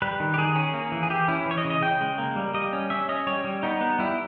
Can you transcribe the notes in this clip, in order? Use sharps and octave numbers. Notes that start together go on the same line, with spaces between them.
G3 B4
D#3
G4
D#3 G#4
C#4
A#3
E3
G#4
E3 G4
C#4 E4
E3
C#5
D#5
C#3
D#5
C#3 G5
G#3
A#3
G3
G3 D#5
C#4
C#4 E5
C#4 D#5
G3 C#5
G3
B3 D#4
B3
G3 E4